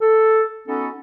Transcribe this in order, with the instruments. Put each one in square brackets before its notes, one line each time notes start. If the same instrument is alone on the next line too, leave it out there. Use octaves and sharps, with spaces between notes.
[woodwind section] A4
B3 C#4 D#4 F#4 A4